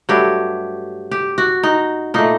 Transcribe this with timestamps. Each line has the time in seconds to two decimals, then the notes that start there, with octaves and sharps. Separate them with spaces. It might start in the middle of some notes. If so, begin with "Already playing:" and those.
0.09 G2 F#3 A3 G4
1.11 G4
1.38 F#4
1.63 D#4
2.14 A#2 A3 D#4